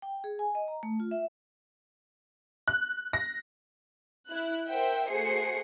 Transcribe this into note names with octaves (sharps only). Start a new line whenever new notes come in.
G5
G#4
G#5
D#5
A#5
A3
F4
E5
F#6
A#6
E4 F#6
A#4 C5 E5 F#5 G5
A3 F#4 G#4 C5 C7 C#7